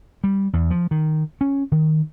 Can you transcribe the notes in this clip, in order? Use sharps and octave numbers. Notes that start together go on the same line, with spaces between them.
G3
E2
F3
D#3
C#4
D#3